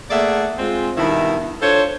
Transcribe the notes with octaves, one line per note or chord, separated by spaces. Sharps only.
A3 A#3 G#4 D5 E5 F#5
G#3 C4 F4
G2 B2 D#3 E4
D4 F4 A4 C5 C#5